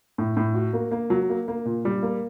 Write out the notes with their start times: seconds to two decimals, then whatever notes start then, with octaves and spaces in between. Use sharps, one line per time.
0.18 A2
0.37 A2
0.55 F#4
0.73 A#3
0.91 A#3
1.10 F#3
1.30 A#3
1.48 A#3
1.65 A#2
1.85 G3
2.03 A#3